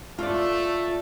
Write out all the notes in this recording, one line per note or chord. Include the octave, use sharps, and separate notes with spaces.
A3 F4 D5